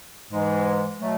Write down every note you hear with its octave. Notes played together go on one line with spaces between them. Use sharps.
G#2 E3 G#3
B2 F#3 A3